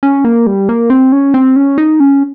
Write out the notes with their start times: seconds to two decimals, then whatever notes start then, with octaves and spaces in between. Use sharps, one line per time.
0.03 C#4
0.24 A#3
0.47 G3
0.69 A#3
0.90 C4
1.12 C#4
1.34 C4
1.56 C#4
1.78 D#4
2.00 C#4